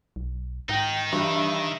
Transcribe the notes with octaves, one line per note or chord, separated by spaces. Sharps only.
B1
G#2 D#3 D#4 G5
G2 E3 E5